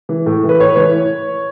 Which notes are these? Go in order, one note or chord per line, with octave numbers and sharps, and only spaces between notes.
E3
A2
E3
B4
A2 C#5
B4
E3 C#5